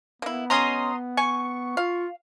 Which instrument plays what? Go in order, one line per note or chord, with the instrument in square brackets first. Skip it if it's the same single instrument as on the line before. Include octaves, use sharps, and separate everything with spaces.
[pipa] A#3 E4 [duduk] B3
[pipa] F#3 G#3 C#4 [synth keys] A#5 C6 D#6
[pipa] G#5 [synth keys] C#6
[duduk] F4 [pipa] F5